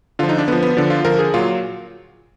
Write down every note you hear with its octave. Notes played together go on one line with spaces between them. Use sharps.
D3 F3 F4
D#4
D4
D3 F3 B3
B3
D3 F3 D4
F4
D3 F3 A#4
G#4
A#2 F#3 F4